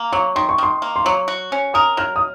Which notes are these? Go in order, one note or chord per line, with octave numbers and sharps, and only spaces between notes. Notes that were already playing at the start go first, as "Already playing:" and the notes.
Already playing: A#3
F#3 C#6
D#3 C6
C#6
D#3 C6
A#3
C6
F#3 C#6
F#4
C#4
A#4 D#6
F#3 F6
D#6